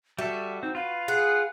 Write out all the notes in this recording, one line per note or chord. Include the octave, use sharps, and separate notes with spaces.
G3 F#4 A4 E5
C4 D#4
F4 B4 F5
G#4 F#5